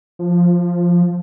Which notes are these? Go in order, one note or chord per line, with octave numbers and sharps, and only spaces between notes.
F3